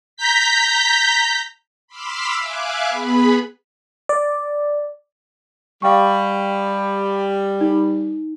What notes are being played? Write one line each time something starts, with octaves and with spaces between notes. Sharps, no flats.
A#5 G6 B6
B5 C6 D6 E6 F6 B6
E5 F5 G#5 D6 F#6
B3 G#4 B4 B5
D5
G3 F5 G5 C#6
D#4